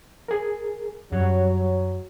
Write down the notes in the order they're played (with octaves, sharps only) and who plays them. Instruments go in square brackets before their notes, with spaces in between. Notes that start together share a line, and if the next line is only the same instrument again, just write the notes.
[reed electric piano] G#4 A#4
[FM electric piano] F#2 [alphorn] F#3 [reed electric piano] G3 F#4 C#5